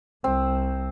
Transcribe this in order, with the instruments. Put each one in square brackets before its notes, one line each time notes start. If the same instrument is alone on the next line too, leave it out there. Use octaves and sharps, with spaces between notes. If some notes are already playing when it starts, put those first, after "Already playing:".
[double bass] C2 [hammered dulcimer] C4